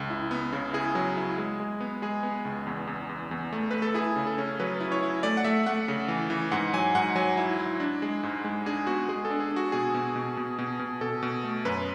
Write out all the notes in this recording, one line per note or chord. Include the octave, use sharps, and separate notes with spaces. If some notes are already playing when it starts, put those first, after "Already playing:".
Already playing: C#2
E4
B3
C#3
E4 G#4
F#3
E4
G#3
G#3
B3
G#3 G#4
B3
C#2
E2
E2
E2
E2
A3
A3 B4
A4
E4 G#4
C#3
A4
C#4
F#3 B4
E4
C#5
E4
A3 D5
F#5
A3 E5
A3 F#5
C#3
E3
E3
G#2 F#5
F#3 G#5
G#2 F#5
F#3 G#5
E4
E4
D4
G#3
G#2
G#3
D4 G#4
B3 F#4
G#3 G#4
A4
D4
G#4
D4
F#4
B2 G#4
B2
B2
B2
B2
B2
B2 A4
B2
A3
F#2 B4